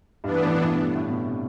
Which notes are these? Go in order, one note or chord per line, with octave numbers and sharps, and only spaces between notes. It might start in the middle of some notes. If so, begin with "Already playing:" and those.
G2 E3 B3 D4
A2
B2
A2
G2
A2
B2
C3